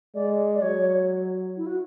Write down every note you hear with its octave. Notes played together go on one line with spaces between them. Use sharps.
G#3 D5
D5
F#3 C#5
E4
F#4